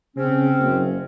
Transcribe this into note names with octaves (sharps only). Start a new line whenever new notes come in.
C#3 C4 C#4
F#1